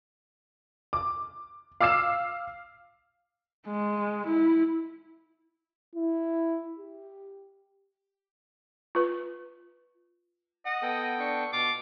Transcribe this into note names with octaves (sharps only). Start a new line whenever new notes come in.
D6
F5 D6 E6 C7 E7
G#3
E4
E4
G4
F4 B4
D#5 F#5
B3 A4 G5
D4 C#6
B2 F4 D6